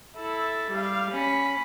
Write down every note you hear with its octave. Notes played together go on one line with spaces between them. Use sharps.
E4 A4
G3 F5
C#4 B5